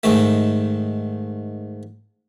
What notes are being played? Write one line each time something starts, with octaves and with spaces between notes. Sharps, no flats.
G#2 D#3 A3